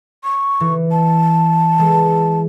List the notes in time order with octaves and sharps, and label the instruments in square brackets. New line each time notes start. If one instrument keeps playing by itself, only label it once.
[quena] C#6
[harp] E3
[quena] A5
[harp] E3 G#3